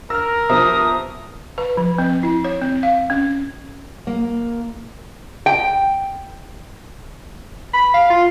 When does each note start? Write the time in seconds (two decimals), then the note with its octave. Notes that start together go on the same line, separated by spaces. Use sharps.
0.10 A#4 E6 F6 A#6
0.49 B2 F3 G4 C5 E5 A#5 D#6
1.58 B4
1.77 F3
1.98 C4
2.23 E4
2.44 C#5
2.62 C4
2.83 F5
3.10 C#4
4.07 A#3
5.46 G5
7.73 B5
7.94 F5
8.10 F4